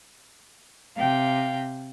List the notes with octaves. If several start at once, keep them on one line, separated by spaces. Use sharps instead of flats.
C3 F5 G5